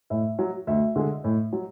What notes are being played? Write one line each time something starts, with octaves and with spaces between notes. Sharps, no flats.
A2 E5
F#3
D2 E5
D3 G#3
A2
F#3